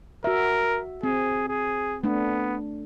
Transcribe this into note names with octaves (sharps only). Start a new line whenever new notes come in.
F#4 A#4 E5
C4 G#4
G#4
A3 B3 D4